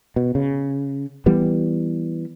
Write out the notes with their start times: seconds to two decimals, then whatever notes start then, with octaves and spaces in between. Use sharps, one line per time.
0.16 B2
0.35 C#3
1.26 E3 G3 B3